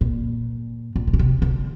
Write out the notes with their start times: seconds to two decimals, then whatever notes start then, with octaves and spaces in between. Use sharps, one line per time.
0.01 A#2
0.96 A#2
1.07 C3
1.13 A#2
1.19 C3
1.42 D3